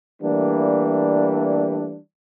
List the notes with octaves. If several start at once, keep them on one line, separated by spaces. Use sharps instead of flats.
E3 G3 A3 A#3 D4